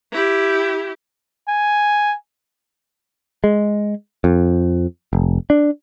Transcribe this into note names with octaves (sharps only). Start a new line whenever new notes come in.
E4 G4
G#5
G#3
F2
F1
D4